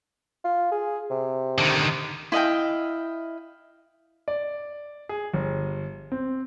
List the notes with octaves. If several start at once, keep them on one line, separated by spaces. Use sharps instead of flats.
F4
G#4
C3
D3 D#3
E4 D#5 F5 G5
D5
G#4
G1
C4